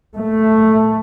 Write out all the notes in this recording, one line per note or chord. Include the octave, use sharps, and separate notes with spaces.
A3